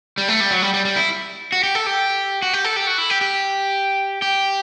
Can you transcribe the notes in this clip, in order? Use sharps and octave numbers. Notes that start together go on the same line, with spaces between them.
G3
A3
G3
F#3
G3
G3
G3
E4
F#4
G4
A4
G4
F#4
G4
A4
G4
F#4
E4
G4
G4
G4